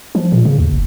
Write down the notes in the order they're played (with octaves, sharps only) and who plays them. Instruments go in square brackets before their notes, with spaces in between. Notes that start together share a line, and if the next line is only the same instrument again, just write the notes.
[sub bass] F3
A#2
C#3
D#2
F1